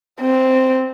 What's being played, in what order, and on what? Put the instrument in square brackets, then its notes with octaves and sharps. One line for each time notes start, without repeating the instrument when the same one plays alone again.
[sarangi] C4